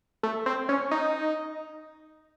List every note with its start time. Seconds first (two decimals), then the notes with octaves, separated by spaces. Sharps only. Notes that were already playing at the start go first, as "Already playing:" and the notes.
0.23 A3
0.46 C4
0.69 C#4
0.91 D#4